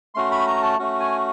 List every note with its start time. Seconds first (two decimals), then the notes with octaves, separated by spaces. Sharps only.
0.15 A3 C#4 F#4 C6
0.32 B5
0.47 A#5
0.63 A5
0.79 A3 C#4 F#4
1.00 G#5